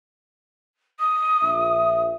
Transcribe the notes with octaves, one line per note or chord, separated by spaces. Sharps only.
D#6
A#1 E5